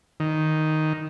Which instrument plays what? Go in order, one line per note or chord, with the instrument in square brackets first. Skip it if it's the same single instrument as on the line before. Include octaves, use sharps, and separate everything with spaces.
[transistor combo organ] D#3